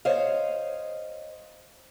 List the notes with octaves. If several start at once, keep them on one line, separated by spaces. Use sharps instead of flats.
C5 C#5 D#5 F5